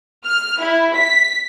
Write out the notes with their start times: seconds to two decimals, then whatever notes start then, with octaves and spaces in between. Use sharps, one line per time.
0.25 F6
0.60 E4
0.94 B6